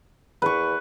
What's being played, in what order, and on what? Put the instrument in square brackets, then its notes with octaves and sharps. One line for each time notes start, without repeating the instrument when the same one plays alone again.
[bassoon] E2 [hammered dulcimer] B4 C#6